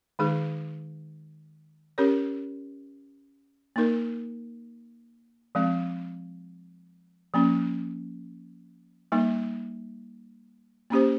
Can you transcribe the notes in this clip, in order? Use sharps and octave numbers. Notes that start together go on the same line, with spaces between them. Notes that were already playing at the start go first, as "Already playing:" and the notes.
D#3 G#3 D#4 G#4
C#4 G4 A#4 C#5
A#3 D#4 A#4
F3 G#3 C4
F3 A#3 C#4
G3 A#3 D#4
A#3 C#4 G4 C5